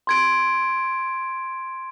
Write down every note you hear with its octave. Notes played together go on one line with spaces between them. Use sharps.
C6 G#6 D7